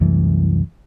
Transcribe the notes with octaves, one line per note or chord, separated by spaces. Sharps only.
C2 F#2 E3 A3